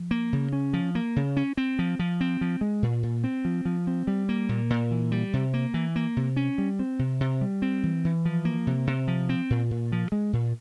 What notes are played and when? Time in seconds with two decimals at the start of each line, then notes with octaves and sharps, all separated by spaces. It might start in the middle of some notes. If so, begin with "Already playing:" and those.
Already playing: F3
0.11 A#3
0.33 C#3
0.53 C#4
0.73 F3
0.95 A#3
1.16 C#3
1.37 C#4
1.57 C4
1.79 F3
1.99 F3
2.21 C4
2.41 F3
2.61 G#3
2.82 A#2
3.03 A#2
3.24 C4
3.45 F3
3.65 F3
3.87 C4
4.07 G3
4.29 A#3
4.49 A#2
4.70 A#2
4.91 E3
5.12 G3
5.33 C3
5.54 A#3
5.74 E3
5.96 A#3
6.17 C3
6.36 C#4
6.58 G3
6.79 C4
6.99 C3
7.20 C3
7.41 G3
7.62 C4
7.83 E3
8.05 E3
8.25 F3
8.45 A#3
8.67 C3
8.87 C3
9.08 F3
9.29 C4
9.50 A#2
9.71 A#2
9.92 F3
10.12 G#3
10.33 A#2